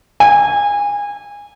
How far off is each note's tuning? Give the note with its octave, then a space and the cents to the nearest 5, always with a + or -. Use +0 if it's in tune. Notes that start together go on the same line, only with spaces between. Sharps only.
G#5 -25